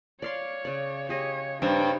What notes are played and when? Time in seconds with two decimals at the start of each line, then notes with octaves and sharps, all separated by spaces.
0.22 C#5 D5 F5 C6
0.65 C#3 D5
1.09 G4 G#4 C#5 D#5
1.62 G2 C4 D#4 C#5